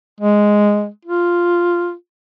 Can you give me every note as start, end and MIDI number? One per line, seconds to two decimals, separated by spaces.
0.21 0.88 56
1.05 1.93 65